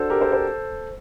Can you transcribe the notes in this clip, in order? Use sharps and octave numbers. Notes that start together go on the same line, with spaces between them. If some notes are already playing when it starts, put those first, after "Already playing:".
Already playing: D4 F#4 A4 C5
G4 A#4
A4 C5
A4 C5